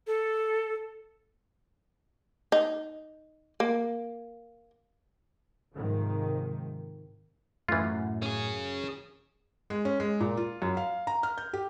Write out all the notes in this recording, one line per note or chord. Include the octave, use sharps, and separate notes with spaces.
A4
D#4
A#3
G#2 C3 D#3 F3
F#2 A2 E3 F4
C#4 G#4
G#3
C#4
G#3
A#2
F4
F#2
F5
A#5
F6
G6
G4